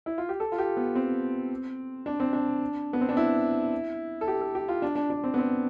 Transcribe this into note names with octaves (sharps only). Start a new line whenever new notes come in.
E4
F4
G4
A4
F4
G4
B3
C4
D4
C4
D4
B3
C4
D4
E4
A4
G4
A4
G4
F4
D4
D4
D4
C4
B3
C4